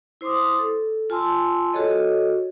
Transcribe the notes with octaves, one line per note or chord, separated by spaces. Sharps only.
E4 C5 C6 D6 D#6
A4
F4 G#5 A5 C6 E6
F#4 G#4 A4 C#5 D#5